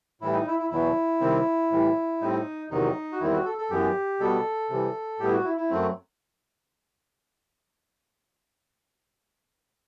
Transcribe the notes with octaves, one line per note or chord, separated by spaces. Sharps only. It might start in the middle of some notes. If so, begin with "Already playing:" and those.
A2 E3 G3 E4
D#4
E4
E4
E2 B2 F#3 E4
C3 D#3 G3 C4
A2 E3 G3
A2 G3 C4 D#4
E2 C3 D#3 F#3 D#4
F#4
E2 D#3 G3 C4 E4
F#4
A4
A4
F#2 E3 B3 G4
B2 G3 B3 A4
C3 E3 G3
A2 G3 B3 G4
E4
F#4
E4
E4
F#2 F#3 A3 C4